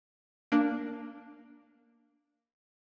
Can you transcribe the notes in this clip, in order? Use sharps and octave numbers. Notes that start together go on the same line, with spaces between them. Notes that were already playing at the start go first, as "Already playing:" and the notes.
A#3 D4